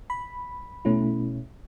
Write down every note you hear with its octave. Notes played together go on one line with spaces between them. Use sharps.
B5
B2 A3 C#4 E4